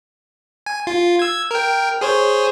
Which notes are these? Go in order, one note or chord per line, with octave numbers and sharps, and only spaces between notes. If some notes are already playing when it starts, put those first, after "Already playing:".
G#5
F4
E6 G#6
A#4 G5
G#4 C5 C#5